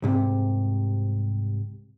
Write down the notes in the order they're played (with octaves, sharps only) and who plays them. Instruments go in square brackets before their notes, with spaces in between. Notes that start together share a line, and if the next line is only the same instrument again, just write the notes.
[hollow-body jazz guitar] C2 G#2 C3